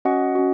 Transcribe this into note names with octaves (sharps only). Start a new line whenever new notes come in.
C#4 F#4 D#5 F#5
C#4 F#4